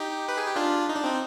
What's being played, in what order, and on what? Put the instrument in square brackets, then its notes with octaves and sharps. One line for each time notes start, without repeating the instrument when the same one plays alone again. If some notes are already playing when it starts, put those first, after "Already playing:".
Already playing: [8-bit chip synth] D#4 G4
B4
G#4
G4
D4 F4
D#4
D4
C4 D#4